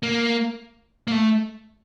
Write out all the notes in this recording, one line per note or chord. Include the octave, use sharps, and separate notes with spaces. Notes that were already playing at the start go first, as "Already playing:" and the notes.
A#3
A#3
A3